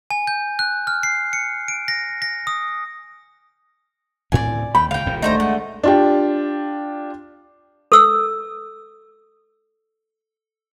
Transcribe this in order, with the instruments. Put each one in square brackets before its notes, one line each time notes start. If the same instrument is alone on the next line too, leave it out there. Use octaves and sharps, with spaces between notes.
[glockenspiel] G#5
G6
F#6
F6
C7
C#7
D7
A#6
A#6
D#6
[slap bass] D2 A2 C4 [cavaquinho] D5 G#5
[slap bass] D#2 [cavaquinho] G5 [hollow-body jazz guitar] B5
[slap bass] C#2 A#2 [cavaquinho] F5 G5
[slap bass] D#1 C2 A#2
[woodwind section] D3 A3 [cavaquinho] D#4 C5 A#5
[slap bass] G#3 [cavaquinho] F#5
[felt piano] D4 F4 G4
[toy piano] A4 E6